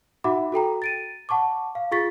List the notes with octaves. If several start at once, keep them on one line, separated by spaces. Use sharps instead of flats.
D#4 F#4 E5 F#5 B5 D6
F#4 A4 G5 A#5
A6 D7 D#7
F#5 A5 C#6 D6
F5
F4 G#4 C#6 A6 B6